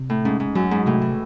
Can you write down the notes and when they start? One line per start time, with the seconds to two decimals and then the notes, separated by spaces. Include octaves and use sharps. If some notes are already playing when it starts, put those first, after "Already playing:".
Already playing: C3
0.10 A2
0.25 G#2 C#4
0.40 G#2
0.55 F#2 F#3
0.71 G#2
0.86 A2 C3
1.02 E3